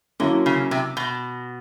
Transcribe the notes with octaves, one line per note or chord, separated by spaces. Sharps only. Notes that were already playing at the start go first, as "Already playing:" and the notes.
D3 F#3 A#3 C#4 E4
C#3
C3
B2